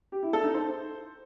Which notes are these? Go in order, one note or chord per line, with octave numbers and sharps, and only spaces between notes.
G4
E4
A4
D#4
C5